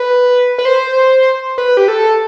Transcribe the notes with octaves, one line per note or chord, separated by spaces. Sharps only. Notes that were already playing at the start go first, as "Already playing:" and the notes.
Already playing: B4
B4
C5
B4
G4
A4